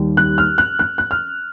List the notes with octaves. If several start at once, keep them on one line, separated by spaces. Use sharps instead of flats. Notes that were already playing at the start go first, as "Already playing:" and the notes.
Already playing: D#2 D#3 G3
F#6
F6
F#6
F#6
F#6
F6